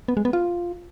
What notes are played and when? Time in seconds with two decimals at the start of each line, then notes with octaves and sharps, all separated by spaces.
0.08 B3
0.17 G#3
0.25 B3
0.33 F4